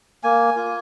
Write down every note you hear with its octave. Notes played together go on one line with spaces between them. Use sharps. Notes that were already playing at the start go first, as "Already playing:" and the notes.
A#3 G#5
F4